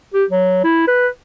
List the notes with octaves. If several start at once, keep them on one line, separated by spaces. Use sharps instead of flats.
G4
F#3
E4
B4